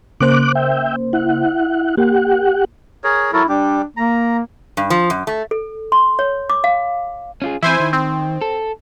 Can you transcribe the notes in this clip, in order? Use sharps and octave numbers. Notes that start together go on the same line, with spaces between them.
C#3 A#3 C5 D6 F#6
E5 G5
E4 F#5
A#3 G4 F#5
G#4 A#4 C#5
F#3 E4 A4 A#4
G3 D4 G4
A#3 A#5
G2
F3
F#2
A3
A4
C6
C#5
D6
F5
C#4 F4 G#4
E3 C4 E4 C5 G#5
D#3
C4
A4